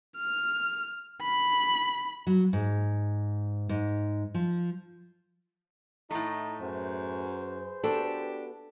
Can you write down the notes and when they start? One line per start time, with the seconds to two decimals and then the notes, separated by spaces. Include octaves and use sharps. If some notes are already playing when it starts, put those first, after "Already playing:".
0.17 F6
1.22 B5
2.27 F#3
2.53 G#2
3.69 G#2
4.34 F3
6.11 A2 A3 D#4 E4
6.61 F#2 G#4 B4 C5
7.84 B3 D4 F#4 G4 A4